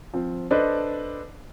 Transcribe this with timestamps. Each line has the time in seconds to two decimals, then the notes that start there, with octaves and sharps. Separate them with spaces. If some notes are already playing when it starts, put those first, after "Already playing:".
0.14 F3 C4
0.51 D4 A4 B4 C5 D#5